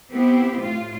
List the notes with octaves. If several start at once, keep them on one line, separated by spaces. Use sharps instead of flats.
B3 C4 E4 G4
A2 F4